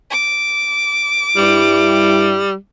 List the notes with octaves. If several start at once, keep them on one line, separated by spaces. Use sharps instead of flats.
D6
G2 G3 E4